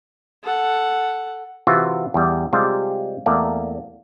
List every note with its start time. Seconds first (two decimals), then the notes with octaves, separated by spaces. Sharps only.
0.43 A4 F#5
1.67 C3 E3 F4 F#4 E5
2.14 E2 G3
2.53 C3 G3 G#3 F4
3.26 E2 A3 A#3 D5